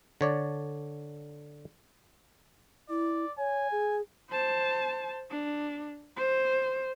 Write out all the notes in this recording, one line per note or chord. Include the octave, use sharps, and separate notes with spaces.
D3 C#5 D5
E4 D5
C#5 G#5
G#4
C5 A5
D4
C5